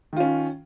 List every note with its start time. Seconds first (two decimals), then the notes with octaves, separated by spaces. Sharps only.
0.13 D#3
0.17 F4
0.20 C#4